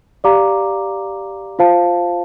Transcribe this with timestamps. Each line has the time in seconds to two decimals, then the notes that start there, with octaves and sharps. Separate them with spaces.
0.24 G4 D5 F5 A#5 D6
1.59 F4 C5 F5 A5